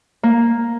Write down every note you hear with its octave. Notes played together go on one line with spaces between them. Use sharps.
A#3